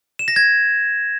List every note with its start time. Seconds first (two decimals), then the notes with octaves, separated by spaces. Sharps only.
0.19 E7
0.28 A#6
0.36 G#6